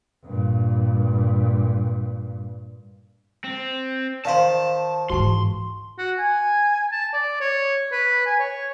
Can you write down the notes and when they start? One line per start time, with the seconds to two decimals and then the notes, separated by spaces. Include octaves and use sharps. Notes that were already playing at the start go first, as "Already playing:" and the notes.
0.25 G2 A#2
3.44 C4
4.25 D#3 C5 D5 F5 A5 C6
5.10 G#2 E3 F#4 A5 C6 C#6
5.98 F#4
6.19 G#5
6.92 A5
7.14 D5
7.41 C#5
7.92 B4
8.26 G#5
8.39 C#5